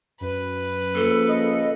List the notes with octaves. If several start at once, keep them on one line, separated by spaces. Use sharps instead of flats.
F#2 B4
C#3 F3 A#3 A4
D#5